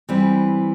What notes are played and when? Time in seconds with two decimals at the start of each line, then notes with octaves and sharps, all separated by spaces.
0.09 E3 G3 C4